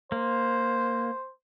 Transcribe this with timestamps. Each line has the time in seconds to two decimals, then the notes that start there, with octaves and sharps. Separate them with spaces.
0.12 A#3 C5